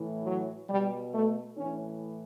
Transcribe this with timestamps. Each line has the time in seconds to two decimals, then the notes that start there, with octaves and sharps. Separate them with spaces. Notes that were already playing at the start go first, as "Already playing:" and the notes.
Already playing: A2 E3
0.24 F#3
0.69 B2 G3
1.13 A3
1.58 A2 E3 C#4